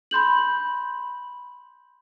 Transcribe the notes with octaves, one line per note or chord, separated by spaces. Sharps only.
B5 C6 G6 F#7